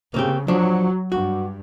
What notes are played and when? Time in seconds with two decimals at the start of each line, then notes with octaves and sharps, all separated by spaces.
0.14 C#3 A#3 C4 G4
0.48 F3 F#3 D4
1.12 G2 F#4